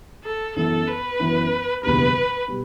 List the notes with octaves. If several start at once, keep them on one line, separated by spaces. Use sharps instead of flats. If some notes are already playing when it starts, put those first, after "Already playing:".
A4
F#2 E3 B3 A4
B4
F#2 E3 B3
F#1 E2 B2 G3 D4 B4
B2 G3